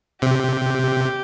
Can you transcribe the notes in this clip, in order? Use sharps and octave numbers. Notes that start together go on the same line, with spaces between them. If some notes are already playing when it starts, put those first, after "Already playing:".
C3 G4